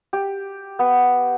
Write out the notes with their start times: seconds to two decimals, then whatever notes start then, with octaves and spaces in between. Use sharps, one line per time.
0.13 G4
0.79 B3